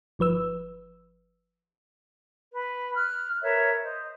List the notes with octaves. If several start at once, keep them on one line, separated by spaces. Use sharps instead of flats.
G1 F3 B4 E6
B4
F6 F#6
A#4 B4 C#5 E5
C5 D#5